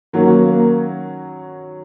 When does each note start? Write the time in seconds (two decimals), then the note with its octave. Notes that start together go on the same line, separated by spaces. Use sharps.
0.13 D#3 F#3 A#3 C#4 F#4
0.45 A#3